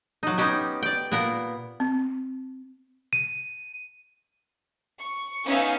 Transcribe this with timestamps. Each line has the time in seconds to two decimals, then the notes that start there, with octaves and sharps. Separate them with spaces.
0.23 F#3 D#4
0.38 B3 C#4 D#4 G4
0.83 D5 G5
1.12 A#2 B3 A#4
1.80 C4
3.13 D#7
5.00 C#6
5.47 B3 C#4 D#4 E5 F5 G#5